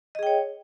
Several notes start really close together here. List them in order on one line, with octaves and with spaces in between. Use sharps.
D#5 G#4 G5 C#5